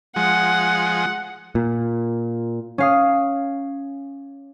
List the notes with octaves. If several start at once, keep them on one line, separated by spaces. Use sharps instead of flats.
F3 G#3 F#5
A#2
C#4 F5 D#6